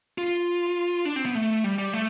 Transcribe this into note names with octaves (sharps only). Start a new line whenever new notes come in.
F4
D4
C4
B3
A3
G3
G3
A3